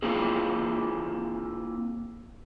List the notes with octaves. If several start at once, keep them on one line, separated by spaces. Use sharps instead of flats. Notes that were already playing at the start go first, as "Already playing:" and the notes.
A#3 C4 E4 F4 G#4